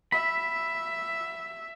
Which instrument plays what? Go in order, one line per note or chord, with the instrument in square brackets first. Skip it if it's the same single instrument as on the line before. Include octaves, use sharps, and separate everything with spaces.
[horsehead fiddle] E5 [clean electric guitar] B5